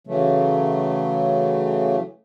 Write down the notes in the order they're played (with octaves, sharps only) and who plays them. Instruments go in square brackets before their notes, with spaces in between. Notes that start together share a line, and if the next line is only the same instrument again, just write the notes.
[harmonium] C#3 E3 F#3 A3